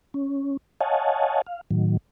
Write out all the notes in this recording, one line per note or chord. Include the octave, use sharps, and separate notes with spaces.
C#4
C#5 D#5 F5 F#5 G#5 A5
F5
A2 D#3 F#3